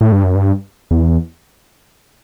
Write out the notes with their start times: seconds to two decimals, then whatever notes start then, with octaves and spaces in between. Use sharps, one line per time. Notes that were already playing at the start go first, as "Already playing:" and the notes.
0.01 A2
0.12 G2
0.24 F#2
0.35 G2
0.91 E2